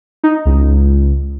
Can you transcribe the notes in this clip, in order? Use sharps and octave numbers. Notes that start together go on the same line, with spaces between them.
D#4
C#2